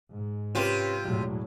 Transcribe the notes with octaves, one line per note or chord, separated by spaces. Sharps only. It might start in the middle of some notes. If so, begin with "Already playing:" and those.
G#2
C3 C#4 F4 G4 B4
E1 A2 F#3